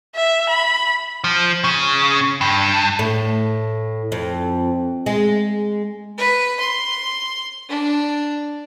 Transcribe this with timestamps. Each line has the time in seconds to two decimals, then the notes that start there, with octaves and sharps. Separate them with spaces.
0.16 E5
0.49 B5
1.24 F3
1.64 C#3
2.41 G2
2.99 A2
4.12 F2
5.06 G#3
6.18 B4
6.60 C6
7.69 D4